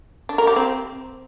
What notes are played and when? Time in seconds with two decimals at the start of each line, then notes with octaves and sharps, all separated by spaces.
0.29 D4
0.38 A#4
0.47 G4
0.56 C4